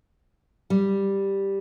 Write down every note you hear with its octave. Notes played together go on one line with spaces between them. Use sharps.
G3